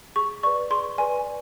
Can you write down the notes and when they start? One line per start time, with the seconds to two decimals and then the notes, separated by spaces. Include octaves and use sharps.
0.16 G#4 C#6
0.43 B4 D5 C#6
0.71 G#4 C6
0.98 B4 D5 G#5